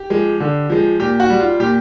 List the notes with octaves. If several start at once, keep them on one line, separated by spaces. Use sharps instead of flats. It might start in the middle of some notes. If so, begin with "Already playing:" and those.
Already playing: G4
F3 G#3
D3
F3 G#3
A#2 G4
F#4
G3
F4
A#2 G4